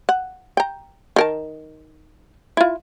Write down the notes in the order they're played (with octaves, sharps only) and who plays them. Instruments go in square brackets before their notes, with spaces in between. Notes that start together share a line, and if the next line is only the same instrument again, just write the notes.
[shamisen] F#5
G5 A#5
D#3 A#4 A5
E4 F4